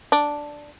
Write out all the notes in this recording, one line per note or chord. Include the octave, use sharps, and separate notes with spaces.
D4